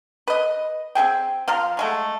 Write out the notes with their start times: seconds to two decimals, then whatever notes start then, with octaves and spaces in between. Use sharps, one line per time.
0.28 B4 D#5
0.95 C4 E4 G#4 G5
1.48 F3 F5 A#5 C6
1.77 F#3 G#3 A3